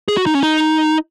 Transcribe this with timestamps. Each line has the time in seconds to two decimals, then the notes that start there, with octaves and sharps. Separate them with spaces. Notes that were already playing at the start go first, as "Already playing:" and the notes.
0.08 G#4
0.17 F#4
0.26 D#4
0.35 C#4
0.43 D#4